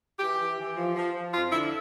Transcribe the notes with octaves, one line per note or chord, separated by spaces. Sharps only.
E3 G4
E3
E3
F3
F3
F3
F2 F4
D3 E4